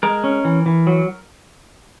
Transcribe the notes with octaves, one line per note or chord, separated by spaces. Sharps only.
G#3 A#4
C#4
E3
E3
F#3